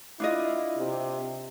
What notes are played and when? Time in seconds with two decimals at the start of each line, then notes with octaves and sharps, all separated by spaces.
0.20 D4 E4 F4 D#5
0.77 C3